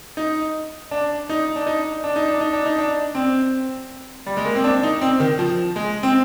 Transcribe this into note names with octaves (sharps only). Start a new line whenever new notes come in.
D#4
D4
D#4
D4
D#4
D4
D#4
D4
D#4
D4
D#4
D4
C4
G3
G#3
A#3
C4
D4
D#4
C4
D#3
F3
G#3
C4